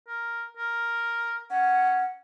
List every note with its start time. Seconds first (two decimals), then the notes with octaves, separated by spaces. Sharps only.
0.07 A#4
0.57 A#4
1.51 C#4 F#5